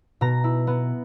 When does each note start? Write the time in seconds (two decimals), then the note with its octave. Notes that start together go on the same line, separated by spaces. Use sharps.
0.21 B2 A#5
0.44 E4
0.67 B3